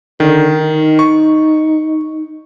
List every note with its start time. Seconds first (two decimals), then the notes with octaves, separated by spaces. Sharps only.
0.20 D3 D#3
0.58 D#4
0.99 C#6